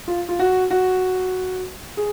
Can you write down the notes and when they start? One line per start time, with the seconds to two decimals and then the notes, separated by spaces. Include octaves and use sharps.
0.08 F4
0.29 F4
0.39 F#4
0.70 F#4
1.97 G#4